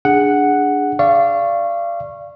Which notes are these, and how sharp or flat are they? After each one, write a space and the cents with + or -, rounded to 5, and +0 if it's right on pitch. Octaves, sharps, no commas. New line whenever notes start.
D4 +0 G#4 -10 F#5 +0
D5 +0 F5 -30 C#6 -15